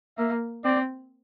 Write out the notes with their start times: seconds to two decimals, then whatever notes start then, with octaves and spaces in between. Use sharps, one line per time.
0.17 A#3 E5
0.64 C4 D5